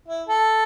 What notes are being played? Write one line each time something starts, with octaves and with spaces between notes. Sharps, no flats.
E4
A4